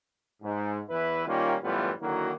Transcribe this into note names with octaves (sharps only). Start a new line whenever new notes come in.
G#2
E2 E3 E4 B4
D#3 G3 A#3 C#4 F4
F#2 A2 E3 G3 B3 F4
D3 D#3 F#3 A#3 E4 F#4